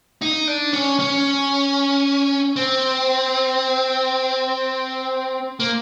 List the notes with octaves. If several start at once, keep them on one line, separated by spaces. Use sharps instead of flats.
D#4
D4
C#4
C#4
C4
A#3